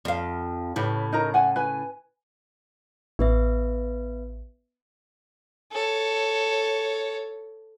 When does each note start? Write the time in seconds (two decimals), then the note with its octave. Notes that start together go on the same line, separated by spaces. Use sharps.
0.05 F2 F5
0.76 A2 C#3 G4 B4
1.12 D#4 A#4 A#5
1.34 F#5 G#5
1.56 B4 G#5
3.19 A1 B3 B4 E5
5.72 A4 C#5